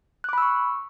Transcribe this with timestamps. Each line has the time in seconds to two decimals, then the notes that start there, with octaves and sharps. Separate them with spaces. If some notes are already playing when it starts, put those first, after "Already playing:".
0.24 F#6
0.29 D6
0.33 B5
0.38 E6
0.42 C#6